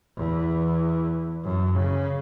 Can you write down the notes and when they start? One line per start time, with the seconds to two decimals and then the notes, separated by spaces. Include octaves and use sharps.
0.16 E2
1.44 F#2
1.75 C#3